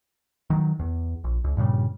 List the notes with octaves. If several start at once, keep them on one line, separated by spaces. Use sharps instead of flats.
D#3 F#3
E2
A#1
C#2
G2 A#2 C#3 G3